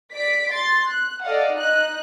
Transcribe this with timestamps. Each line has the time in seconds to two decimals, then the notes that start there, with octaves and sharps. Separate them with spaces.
0.13 D5 B6 D7
0.52 C6 A6
0.89 F#6
1.23 A4 D5 D#5 F5 F#5
1.53 D#4 F#6